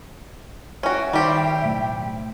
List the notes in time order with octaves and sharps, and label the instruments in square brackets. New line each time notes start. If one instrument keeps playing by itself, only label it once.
[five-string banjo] C#4 F#4 [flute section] E5 G5
[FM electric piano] D#3 [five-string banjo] G3 G4 C5
[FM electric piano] B1 A2